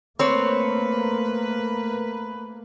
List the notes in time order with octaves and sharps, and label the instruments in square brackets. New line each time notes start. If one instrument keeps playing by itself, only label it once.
[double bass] A3 A#3 [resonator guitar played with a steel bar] C4 C#5 [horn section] A#4 B4